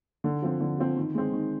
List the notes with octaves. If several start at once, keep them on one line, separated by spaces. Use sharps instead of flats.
D3
F3 C4
D3
F3 C4
D#3
G#3 C4
D#3